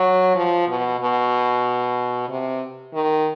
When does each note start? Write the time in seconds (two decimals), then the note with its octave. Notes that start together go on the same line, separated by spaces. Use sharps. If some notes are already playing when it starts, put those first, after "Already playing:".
Already playing: F#3
0.35 F3
0.68 B2
1.00 B2
2.29 C3
2.94 D#3